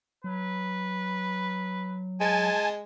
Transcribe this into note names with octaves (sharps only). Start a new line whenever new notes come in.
F#3 B4
G#3 G#5 A5